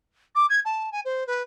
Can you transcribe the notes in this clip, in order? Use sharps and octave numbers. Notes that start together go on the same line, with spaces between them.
D6
G#6
A5
G#5
C5
B4